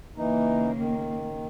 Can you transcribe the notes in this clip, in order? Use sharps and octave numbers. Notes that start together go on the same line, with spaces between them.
C#3 E3 A#3 D#4
D#3